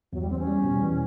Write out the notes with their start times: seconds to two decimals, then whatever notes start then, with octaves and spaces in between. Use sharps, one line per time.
0.13 E2 F#3
0.21 G3
0.30 E2 C4
0.39 C#4
0.47 G3
0.64 B2
0.81 E3